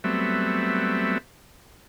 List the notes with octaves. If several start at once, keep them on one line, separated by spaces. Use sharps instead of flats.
F#3 G3 A3 B3 C4 E5